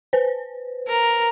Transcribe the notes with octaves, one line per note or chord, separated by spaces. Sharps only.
B4 C5
A#4